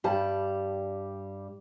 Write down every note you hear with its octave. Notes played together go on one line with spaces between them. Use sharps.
G2 G3 G4 A5